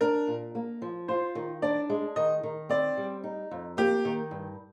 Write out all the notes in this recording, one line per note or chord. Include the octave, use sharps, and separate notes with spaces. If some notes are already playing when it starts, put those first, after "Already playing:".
D4 A#4
A#2
A#3
F3
F4 C5
D#3
D4 D5
G#3
D#3 D#5
D#3
C4 D5
G3
D#4
F2
A#3 G4
D#3
G2